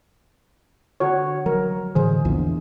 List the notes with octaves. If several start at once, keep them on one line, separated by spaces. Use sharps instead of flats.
D3 F#4 C#5
F#3 A#4
A2 D3 E3 G#4 C5
A#1 E2 F3 D4